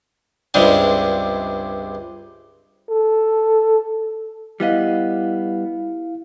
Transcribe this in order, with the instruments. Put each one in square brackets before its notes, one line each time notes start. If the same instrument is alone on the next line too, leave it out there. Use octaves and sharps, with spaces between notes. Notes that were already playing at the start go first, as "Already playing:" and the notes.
[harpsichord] C#2 G2 C3 G#3 D4
[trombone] A4
[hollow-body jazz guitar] G3 B3 D#5 [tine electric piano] E4 F5